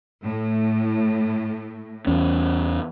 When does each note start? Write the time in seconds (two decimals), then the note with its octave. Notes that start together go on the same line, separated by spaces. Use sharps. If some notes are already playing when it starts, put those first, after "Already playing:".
0.24 A2
2.07 E2 C#4